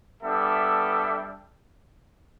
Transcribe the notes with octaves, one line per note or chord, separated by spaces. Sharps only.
G3 B3 D4 A4 E5